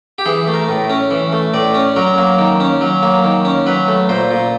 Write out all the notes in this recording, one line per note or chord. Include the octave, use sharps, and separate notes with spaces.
G4
E3 G#4
A3
A#4
A2
C#4
E3
A3
A2 D5
C#4
F#3 A#4
A#3
D#3
C#4
F#3
A#3
D#3
C#4
F#3 B4
A3
A#2 C5
A#2